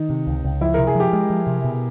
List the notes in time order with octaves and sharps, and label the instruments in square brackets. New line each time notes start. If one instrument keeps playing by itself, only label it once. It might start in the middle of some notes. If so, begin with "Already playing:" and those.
Already playing: [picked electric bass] D#3 [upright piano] D#4
[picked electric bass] C3
C#2
C#2
[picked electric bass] F3 [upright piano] E4
[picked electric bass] C3 [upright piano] A#4
[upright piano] G#4
[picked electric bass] F3 [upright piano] G4
[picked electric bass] G#3
F3
C3
B2